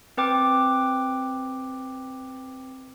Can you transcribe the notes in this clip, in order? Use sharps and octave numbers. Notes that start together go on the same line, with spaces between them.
C4 B4 G5 D6